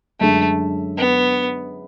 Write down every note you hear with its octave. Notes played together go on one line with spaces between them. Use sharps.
F#2 D3 G#3 A3 D4
B3